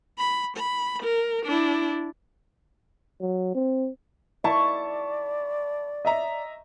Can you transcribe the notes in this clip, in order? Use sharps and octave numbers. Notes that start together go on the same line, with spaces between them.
B5
B5
A#4
D4 E4
F#3
C4
E4 D5 A5 C#6
D#5 E5 A#5